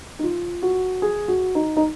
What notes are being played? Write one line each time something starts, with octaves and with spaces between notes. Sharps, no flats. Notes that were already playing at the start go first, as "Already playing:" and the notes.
D#4
F4
F#4
G#4
F#4
D#4
D#4